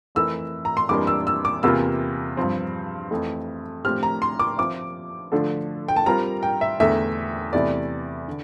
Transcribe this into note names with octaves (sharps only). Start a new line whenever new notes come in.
F2 E3 A3 E4 A#4 E6
A#5
C6
F2 E3 G3 A#3 D4 D6
E6
E6
D6
E2 C3 E3 A#3 F4 E6
G2 F3 C4
F2 E3 A3
A2 F3 C4 G4 F6
A#5
C6
D6
F3 C4 E4 D6
D3 F3 A3 D4 A4
G5
A5
G3 C4 F4 A#4 A#5
G5
E5
E2 D3 A3 E5
E2 C3 E3 A3 E4 D5
D3